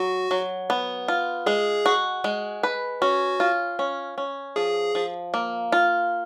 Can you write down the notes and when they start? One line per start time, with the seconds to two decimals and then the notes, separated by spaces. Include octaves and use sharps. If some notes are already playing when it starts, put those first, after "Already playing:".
Already playing: F#3 F#4
0.31 F#3
0.70 B3
1.08 F4
1.46 G#3 G#4
1.86 F#4
2.24 G#3
2.63 B4
3.02 C#4 F#4
3.40 F4
3.79 C#4
4.18 C#4
4.56 F3 G#4
4.95 F3
5.34 A#3
5.72 F4